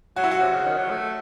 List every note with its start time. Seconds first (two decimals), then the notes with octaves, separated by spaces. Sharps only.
0.16 F#3 F#4
0.24 E4
0.31 F#4
0.41 C3
0.53 C#3
0.65 D#3
0.78 F#3
0.90 A3